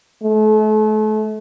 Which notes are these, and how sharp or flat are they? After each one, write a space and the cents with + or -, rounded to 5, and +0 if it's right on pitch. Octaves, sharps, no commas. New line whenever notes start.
A3 -35